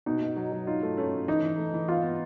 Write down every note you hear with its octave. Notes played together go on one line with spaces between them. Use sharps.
B2 D#4
B2
F#3
F#3
D#4 F4
A3
A3 C#4
A3
E3 D#4
E3
A3
E3
B3 F4
B3